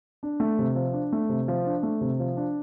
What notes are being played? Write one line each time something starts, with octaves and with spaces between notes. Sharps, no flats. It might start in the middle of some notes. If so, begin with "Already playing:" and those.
D4
A3
C3
F3
D4
A3
C3
F3
D4
A3
C3
F3
D4